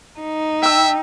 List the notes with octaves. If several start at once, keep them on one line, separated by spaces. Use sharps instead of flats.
D#4
E5 G5 E6